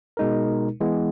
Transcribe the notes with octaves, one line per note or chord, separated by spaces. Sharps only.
B2 G#3 D#4 A#4
E3 G#3 B3